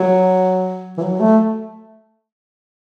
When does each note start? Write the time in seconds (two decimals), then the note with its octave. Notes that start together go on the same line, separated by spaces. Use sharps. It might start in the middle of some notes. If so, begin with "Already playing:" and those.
Already playing: F#3
0.98 E3
1.02 F#3
1.20 A3